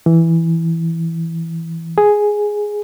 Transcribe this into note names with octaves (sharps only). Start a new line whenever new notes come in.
E3
G#4